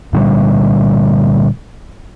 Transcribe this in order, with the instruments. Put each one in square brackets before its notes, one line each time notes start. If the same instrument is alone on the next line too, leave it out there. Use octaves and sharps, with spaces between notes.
[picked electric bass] A#2 D3 G3